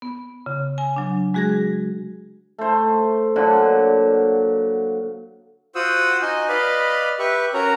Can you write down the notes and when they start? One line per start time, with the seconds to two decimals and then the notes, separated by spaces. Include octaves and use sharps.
0.02 B3
0.46 C#3
0.78 G#5
0.96 F#3 D4
1.34 G#3 F#4 G#4 G#6 A#6
2.59 A3 C5
3.36 A#2 D3 F#3 F#5
5.75 F4 F#4 C5 F#5 D#6 E6
6.22 D#4 F#4 D#5 G#5
6.48 B4 D5 D#5 F5 B5
7.19 G4 B4 E5 C#6
7.54 C#4 F#4 A#4 C#5 A#5